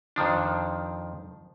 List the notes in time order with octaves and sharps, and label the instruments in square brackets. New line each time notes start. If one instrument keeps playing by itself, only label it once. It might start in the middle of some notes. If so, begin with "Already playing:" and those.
[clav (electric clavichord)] F2 D#3 F3 D4